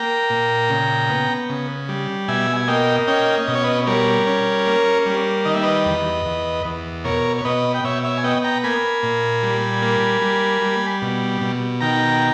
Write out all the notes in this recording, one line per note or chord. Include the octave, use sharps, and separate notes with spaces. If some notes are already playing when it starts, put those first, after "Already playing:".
Already playing: A#3 G5 A#5
A#2
C#3
B3
C#3
G3
B2 E5 G#5
G#5
A#3 D#5 G5
C#4 D#5 G5
B2 D#5
C#5
B4 D#5
G3 A#4 C#5
C#4
A#3
G3
D#3 D#5
E5
B4 D#5
E2
E2
E2
B2 A#4 C#5
C#5
B2 B4 D#5
G5
B2 C#5 E5
C#5 E5
G#5
B3 D#5 G5
G5 A#5
A#3 G#5 B5
A#2
G3
A#3
G3
G3
B2
B2
D#3 G5 A#5